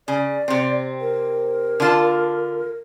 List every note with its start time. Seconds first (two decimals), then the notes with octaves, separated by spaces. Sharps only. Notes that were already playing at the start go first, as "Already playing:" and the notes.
0.08 C#3 D5
0.48 C3 C4
1.01 A#4
1.80 D3 F4 A5